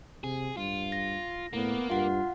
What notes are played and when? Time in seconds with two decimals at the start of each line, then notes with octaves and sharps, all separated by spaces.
0.24 C3 G#4
0.57 G2 F4
0.92 A#6
1.53 A2 A#3 B3
1.90 G2 F4 F5 F#5